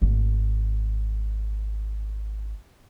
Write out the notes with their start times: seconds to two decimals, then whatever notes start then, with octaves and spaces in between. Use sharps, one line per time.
0.02 G#1 A3